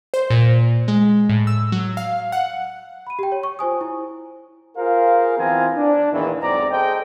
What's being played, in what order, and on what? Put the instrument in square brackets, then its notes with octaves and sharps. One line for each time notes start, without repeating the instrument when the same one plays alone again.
[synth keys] C5
A#2
G#3
A2
E6
F#3
F5
F#5
[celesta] B5 D#7
G4 G5
C#5
C#6
F4 C5 G#5 D#6
E4
[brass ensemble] F4 G#4 A#4 C5 F5
E3 B3 C4 F4 G#5 A#5
D4
E2 A#2 D#3 E3
B1 G#2 C4 D5 A#5
G#4 A4 C5 D#5 G5